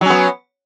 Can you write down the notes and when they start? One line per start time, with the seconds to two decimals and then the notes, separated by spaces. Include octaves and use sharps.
0.01 F#3
0.06 C#4
0.10 B3